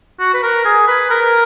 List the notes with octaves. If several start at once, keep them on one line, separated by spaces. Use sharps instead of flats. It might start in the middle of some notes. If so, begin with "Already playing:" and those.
F#4
B4
A#4
G#4
B4
A#4